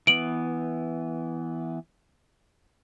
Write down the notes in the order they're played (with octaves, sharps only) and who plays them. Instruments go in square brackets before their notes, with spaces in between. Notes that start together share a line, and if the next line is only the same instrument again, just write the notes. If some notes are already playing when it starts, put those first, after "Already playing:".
[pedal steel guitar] E3 B3 [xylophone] D7 F#7